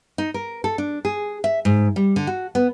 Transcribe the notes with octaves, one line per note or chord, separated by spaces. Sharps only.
D#4
A#4
A4
D4
G#4
E5
G#2
G3
D3
F#4
B3